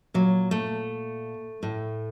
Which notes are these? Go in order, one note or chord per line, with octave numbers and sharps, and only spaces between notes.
A#2 F#3
A3
A2